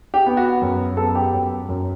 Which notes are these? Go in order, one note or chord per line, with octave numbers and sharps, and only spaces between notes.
G4
B3
F#4
F#2
B3 A4
G4
F#2
F#2